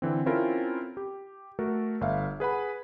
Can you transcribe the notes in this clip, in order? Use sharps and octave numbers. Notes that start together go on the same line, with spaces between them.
D3 E3 C4
C4 C#4 E4 F4 A4 A#4
G4
A3 F#4 A4 A#4
G1 E5 F5
G#4 B4 F#5 B5